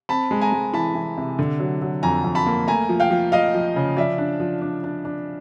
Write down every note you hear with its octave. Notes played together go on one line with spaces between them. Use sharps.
C4 A5 B5
G#3
G#5 A#5
G#3
E3 A5 B5
E3
C3
D3
F#3
F#3
F2 G#5 A#5
F2
A5 B5
A#3
A3 G#5 A#5
F3
F5 G5
F3
F3 D#5 F5
F3
C#3
F3 D5 E5
D4
F3
D4
D4
D4